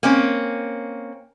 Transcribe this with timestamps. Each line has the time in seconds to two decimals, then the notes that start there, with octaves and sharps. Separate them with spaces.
0.03 A#3 C4 C#4